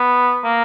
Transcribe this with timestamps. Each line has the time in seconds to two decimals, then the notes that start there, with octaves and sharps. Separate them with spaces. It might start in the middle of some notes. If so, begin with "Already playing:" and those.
Already playing: B3
0.44 A#3